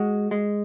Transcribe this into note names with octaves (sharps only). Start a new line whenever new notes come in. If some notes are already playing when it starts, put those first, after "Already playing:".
Already playing: G#3 F#4
G#3